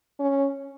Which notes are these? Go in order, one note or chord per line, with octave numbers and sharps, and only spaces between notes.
C#4